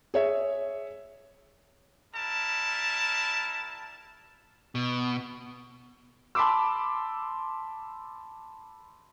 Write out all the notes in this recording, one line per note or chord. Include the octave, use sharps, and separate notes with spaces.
G#4 C#5 E5
G3 E4 A#4 A5
B2
A5 B5 C6 D6 E6